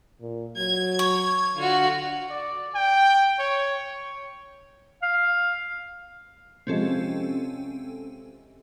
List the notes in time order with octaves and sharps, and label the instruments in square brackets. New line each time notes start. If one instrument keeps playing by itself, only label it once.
[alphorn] A#2
[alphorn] F#3 [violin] G#6
[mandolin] C#5
[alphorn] D3 [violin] F4 F#4
[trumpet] D5
G5
C#5
[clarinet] F5
[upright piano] C3 F3 G#3 [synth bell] C4 C#4 A4